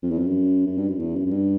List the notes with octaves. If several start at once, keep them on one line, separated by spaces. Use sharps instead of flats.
F2
E2
F2
F#2
F#2
G2
F#2
E2
F#2
F#2
G2